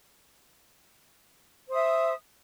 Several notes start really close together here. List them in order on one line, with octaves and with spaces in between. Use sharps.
C5 D#6 E5